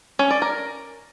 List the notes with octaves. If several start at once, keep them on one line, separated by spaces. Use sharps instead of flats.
C#4
D5
A#4